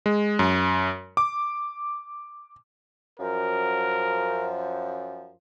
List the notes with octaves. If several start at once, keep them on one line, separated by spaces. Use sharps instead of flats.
G#3
F#2
D6
F#2 F3 A#4